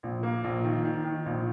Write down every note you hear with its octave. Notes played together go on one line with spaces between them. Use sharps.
A#1
A#3
A#1
D#3
D#3
D#3
A#1